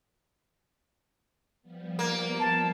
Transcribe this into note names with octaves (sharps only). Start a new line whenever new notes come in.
F3 G3 B3
A#3
A5